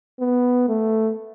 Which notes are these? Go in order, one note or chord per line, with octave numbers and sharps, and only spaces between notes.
B3
A3